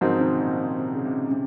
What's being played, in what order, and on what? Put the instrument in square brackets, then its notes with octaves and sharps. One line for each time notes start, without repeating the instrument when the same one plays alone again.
[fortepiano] G#2 F#3 C4 D#4 A#4 [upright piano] C#3 F3
[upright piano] C3 D#3
A#2
C3
C3
C#3
C3
C3